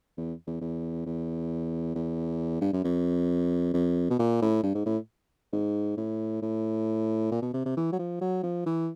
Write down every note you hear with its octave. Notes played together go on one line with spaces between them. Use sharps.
E2
E2
E2
E2
E2
G2
F#2
F2
F2
B2
A#2
A2
G2
G#2
A2
G#2
A2
A2
A#2
B2
C3
C3
E3
F#3
F3
F#3
F3
E3